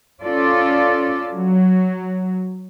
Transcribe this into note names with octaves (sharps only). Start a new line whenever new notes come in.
C#4 F4 A4 D5
F#3